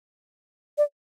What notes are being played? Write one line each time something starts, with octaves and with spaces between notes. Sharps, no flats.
D5